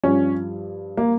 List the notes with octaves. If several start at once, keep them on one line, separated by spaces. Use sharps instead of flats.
G2 F3 C#4
A#3